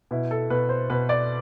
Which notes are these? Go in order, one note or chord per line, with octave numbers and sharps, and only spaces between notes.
B2 E4
A4
B2 B4
C5
B2 B4
D5